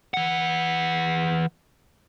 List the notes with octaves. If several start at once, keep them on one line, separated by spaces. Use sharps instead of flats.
E3 F#5